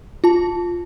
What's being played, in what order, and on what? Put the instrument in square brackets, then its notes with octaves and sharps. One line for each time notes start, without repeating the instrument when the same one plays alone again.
[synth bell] F4 A5